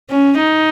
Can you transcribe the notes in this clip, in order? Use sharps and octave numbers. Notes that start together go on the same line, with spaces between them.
C#4
D#4